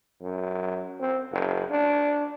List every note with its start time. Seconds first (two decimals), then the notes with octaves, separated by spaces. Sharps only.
0.22 F#2
1.00 C4
1.32 F#1
1.71 D4